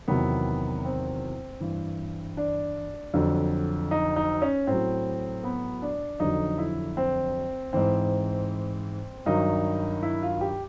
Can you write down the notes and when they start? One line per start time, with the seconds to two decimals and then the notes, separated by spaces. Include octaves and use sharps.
0.08 E2 C3 D#3 F#3 B3
0.85 C4
1.60 G2 E3
2.37 D4
3.14 F2 D3 F#3
3.91 D#4
4.16 D#4
4.42 C#4
4.67 A2 F#3 C4
5.44 B3
5.82 D4
6.20 F2 D3 F#3 D#4
6.58 E4
6.97 C4
7.73 G#2 E3 C4
9.26 G2 D#3 F#3 D#4
10.03 E4
10.22 F4
10.41 G4